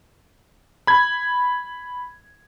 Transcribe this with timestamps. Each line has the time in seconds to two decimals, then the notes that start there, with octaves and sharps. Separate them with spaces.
0.87 B5 G#6